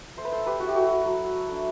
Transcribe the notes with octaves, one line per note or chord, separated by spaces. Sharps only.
A3 C5
B4
A4 C5
G4 B4
E4 F#4
G4
F#4 A4
F#3
A3 D4